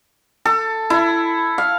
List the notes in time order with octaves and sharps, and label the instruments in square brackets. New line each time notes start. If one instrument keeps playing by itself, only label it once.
[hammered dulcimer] A4
E4
F5